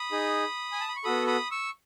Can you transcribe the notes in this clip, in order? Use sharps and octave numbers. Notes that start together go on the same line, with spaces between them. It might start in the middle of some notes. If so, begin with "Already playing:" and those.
Already playing: B5 D#6
D#4 G#4
G#5
A5
B5
C#6
B3 F#4 A4 B5 D#6
B5 D#6
C#6 E6